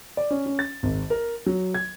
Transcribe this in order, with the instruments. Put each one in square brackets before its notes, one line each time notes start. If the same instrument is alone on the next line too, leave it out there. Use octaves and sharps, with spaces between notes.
[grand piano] D5
C#4
C#4
A6
G#1
A#4
F#3
G#6